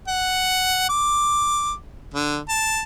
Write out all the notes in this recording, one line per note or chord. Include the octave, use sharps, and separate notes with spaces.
F#5
D6
D3
A5